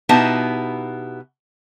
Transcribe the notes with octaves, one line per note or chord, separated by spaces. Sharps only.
B2 B3 D#4 E4 G4 A5